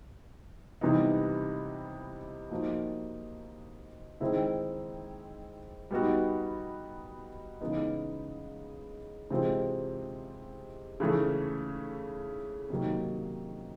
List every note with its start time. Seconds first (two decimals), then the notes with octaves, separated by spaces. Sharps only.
0.81 C3 E3 G3 B3 D#4
2.51 F3 A#3 D#4 F#4
4.20 D#3 G#3 C4 E4
5.91 G3 B3 D#4 F#4
7.61 C#3 E3 G#3 B3 D#4
9.30 C3 E3 G#3 C4 F4
11.00 C#3 E3 A3
12.70 C3 D#3 F#3 A#3